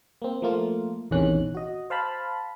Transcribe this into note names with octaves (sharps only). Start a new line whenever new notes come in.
A#3 C4
F3 A3 A#3 F4
A#1 E2 C3 D#3 C#4 F#6
F#4 D#5
C5 F5 A5 B5